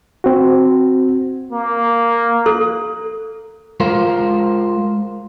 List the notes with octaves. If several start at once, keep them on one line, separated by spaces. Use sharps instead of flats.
C4 F#4
A#3
A4
G#3 F4 A#4 C5